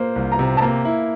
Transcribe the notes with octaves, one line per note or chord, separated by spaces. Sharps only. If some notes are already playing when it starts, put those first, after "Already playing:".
Already playing: A#3 C5
C2
A#5
C3
A5
A#3 A#5
E4